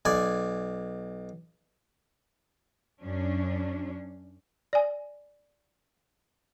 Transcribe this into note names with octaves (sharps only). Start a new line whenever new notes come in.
B1 D5 G#5
F#2 C#4 D4
D5 G#5